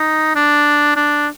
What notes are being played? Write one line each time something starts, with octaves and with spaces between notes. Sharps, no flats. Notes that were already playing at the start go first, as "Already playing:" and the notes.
Already playing: D#4
D4
D4